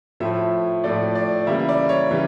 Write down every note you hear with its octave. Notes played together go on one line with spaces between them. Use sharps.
A2 F3 A3 E5
A2 F3 A3 D5
D5
C#3 E3 G3 A#3 E5
E5
D5
C#5
C#3 E3 G3